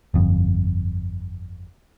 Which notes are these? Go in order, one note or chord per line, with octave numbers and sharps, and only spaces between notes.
G1 F2